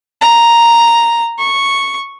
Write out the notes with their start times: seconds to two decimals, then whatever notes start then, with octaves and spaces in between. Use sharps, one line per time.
0.21 A#5
1.38 C#6